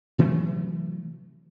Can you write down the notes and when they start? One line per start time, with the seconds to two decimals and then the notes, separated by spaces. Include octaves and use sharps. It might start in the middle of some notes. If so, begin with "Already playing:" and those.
0.18 C3 E3 F#3 A3